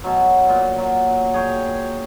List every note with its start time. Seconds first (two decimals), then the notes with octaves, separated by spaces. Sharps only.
0.04 B2 F#3
0.49 A#2
0.78 F#3
1.34 G#4 C#5 G5